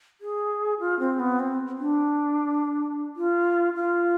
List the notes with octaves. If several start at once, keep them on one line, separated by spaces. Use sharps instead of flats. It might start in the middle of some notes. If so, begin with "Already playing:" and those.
G#4
F4
C4
B3
C4
D4
F4
F4